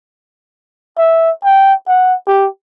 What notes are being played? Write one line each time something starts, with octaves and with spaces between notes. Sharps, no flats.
E5
G5
F#5
G4